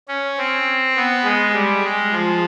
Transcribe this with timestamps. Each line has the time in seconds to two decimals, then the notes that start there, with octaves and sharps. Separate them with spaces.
0.08 C#4
0.38 C4
0.96 B3
1.24 G#3
1.53 G3
1.83 G#3
2.12 F3